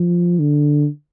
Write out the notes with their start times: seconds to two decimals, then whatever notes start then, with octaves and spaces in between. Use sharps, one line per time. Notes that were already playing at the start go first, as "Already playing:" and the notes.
Already playing: F3
0.39 D3